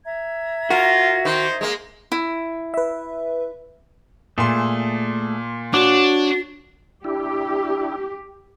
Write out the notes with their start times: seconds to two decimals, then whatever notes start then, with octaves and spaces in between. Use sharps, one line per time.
0.04 E5 A#5 G#6
0.70 F4 F#4 A#4
1.25 D#3 C5
1.61 G#3 A#3
2.12 E4
2.74 B4 E5
4.38 A#2 A3 G#4 A4 C6
5.74 D4 F#4 C#5 F#5 D6
7.04 D4 E4 G4